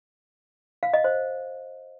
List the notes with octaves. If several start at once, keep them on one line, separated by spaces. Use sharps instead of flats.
F5
D#5
C5